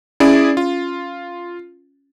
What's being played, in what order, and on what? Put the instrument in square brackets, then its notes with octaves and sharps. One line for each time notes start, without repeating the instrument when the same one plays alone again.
[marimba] C#4 [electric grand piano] E4 G#4 D5
[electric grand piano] F4